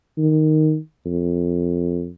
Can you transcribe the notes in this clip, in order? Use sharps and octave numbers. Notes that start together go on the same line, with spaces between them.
D#3
F2